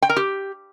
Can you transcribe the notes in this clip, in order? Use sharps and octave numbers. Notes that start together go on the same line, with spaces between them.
G5
A#4
G4